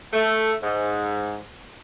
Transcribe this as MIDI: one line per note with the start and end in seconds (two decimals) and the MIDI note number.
0.13 0.54 57
0.63 1.38 44